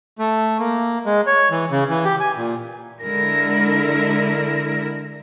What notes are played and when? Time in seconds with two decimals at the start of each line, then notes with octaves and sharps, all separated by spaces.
0.19 A3
0.59 A#3
1.06 G#3
1.27 C#5
1.51 E3
1.71 C#3
1.89 E3
2.05 G4
2.20 G#5
2.37 A#2
3.02 D3 G#3 E4 A#4